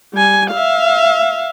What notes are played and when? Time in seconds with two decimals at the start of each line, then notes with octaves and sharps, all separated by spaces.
0.14 G3 G#5
0.52 E5 F5